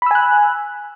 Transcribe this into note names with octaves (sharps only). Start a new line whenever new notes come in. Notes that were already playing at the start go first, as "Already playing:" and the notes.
G#5 B5 E6 F#6